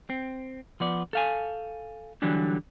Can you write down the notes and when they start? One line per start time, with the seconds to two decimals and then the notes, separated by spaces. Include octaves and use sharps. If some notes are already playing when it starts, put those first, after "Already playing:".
0.10 C4
0.80 F3 B3 D5
1.13 A4 F5 G#5
2.22 D3 E3 F#3 G3 D4